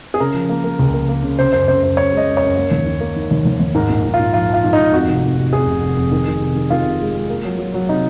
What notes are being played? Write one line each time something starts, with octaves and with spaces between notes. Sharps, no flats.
G#4
C#3 A#4
F3
A#3
A#3
C#2
A#3
A#3
C#3
C#3 C5
F#2 C5
C#3 C5
F#2 C5
F#2 C#5
G#3 D#5
F#2
F#2 C#5
A#3
D#2
D#3
A#3
D#3
D#2
D#2
D#2
G#2 A#4
A#1
G#2
F4
G#2
F3 F4
F3 F4
G#2
D#4
G#2
F2 F#4
F1
F1
C3
F2 G#4
F1
F1
F2
D#3
D#3
C3
D#3
D#3 F4
C3
G#3
G#3
A#3
F#3
F#3
F#3
C3 D#4